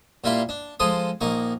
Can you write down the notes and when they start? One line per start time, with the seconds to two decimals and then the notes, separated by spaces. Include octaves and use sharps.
0.24 A#2 G3 E4 F4 F5 C6
0.49 D4
0.80 F3 G#3 A4 C6 D#6
1.21 A#1 A#3 D#4 C#6